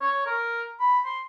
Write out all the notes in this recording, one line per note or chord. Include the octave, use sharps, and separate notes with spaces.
C#5
A#4
B5
C6